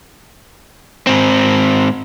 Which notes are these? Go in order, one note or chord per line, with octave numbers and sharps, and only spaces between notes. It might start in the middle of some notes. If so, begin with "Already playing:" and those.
G#2 C4